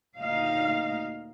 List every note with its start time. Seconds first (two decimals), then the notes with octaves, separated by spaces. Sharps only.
0.18 D2 A#2 D#4 F5